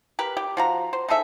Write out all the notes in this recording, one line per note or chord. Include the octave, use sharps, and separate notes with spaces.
G4 A#4 B4
G4
F3 F#4 A#5
C5
D#4 G#4 A4 E5